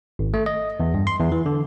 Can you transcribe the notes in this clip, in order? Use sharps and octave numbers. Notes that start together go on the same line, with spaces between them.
G#1
A3
D#5
E2
G2
C6
E2
E3
D3